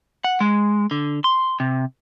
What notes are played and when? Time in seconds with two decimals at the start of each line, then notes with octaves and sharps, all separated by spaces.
0.24 F#5
0.40 G#3
0.91 D3
1.24 C6
1.60 C3